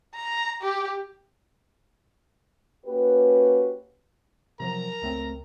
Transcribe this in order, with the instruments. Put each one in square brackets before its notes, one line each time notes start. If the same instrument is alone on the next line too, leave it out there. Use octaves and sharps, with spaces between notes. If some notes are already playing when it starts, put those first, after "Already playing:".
[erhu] A#5
G4
[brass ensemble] A#3 C#4 F#4 G4 B4
[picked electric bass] C3 F3 F#3 [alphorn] A#4 [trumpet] A#5
[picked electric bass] F#1 A3 C4 [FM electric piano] C#2